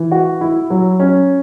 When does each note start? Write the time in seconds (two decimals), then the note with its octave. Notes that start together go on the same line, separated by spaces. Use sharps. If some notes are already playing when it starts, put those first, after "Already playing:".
Already playing: E3
0.11 F#4
0.41 E4
0.70 F#3
1.00 C#4